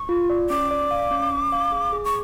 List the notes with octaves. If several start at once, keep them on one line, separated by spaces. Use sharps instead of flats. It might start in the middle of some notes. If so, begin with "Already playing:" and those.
Already playing: C#6
F4
D5
C#4 D6
D5
F5
C#4
C#4
F5
G#4
G#4
C#6